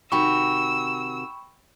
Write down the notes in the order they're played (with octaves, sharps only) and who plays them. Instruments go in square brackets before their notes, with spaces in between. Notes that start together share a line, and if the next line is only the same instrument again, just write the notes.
[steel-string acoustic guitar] C3 D#3 F#4 [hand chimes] G5 B5 C#6 [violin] E6